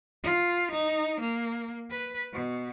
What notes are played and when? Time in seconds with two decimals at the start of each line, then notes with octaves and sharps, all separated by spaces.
0.23 F4
0.71 D#4
1.21 A#3
1.91 B4
2.33 B2